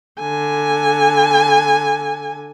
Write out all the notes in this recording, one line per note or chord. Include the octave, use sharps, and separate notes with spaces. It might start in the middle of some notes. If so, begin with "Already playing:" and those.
D3 G#5